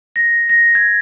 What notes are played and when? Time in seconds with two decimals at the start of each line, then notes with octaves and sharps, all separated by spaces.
0.16 A#6
0.49 A#6
0.75 G#6